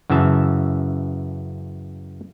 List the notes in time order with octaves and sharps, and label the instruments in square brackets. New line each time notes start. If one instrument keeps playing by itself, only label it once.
[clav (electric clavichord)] F#2 C#3 E3 E5 A5